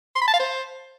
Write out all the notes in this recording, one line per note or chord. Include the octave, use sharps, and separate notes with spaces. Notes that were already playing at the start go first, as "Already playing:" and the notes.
C6
B5
A5
F5
C5